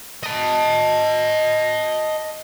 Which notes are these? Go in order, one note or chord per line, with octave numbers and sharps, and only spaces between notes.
D#5 A5